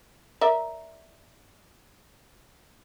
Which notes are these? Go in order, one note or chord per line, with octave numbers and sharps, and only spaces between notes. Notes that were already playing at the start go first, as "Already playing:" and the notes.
A#4 D5 E5